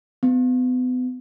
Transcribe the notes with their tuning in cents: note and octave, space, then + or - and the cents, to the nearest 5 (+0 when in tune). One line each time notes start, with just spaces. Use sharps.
B3 +35